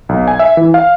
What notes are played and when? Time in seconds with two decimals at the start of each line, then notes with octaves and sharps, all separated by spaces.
0.09 B1
0.28 G#5
0.39 E5
0.57 E3
0.74 F5